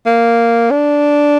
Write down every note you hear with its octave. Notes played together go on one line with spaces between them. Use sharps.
A#3
D4